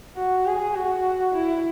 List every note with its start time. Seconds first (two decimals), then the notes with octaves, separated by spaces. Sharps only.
0.16 F#4
0.46 G#4
0.75 F#4
1.34 E4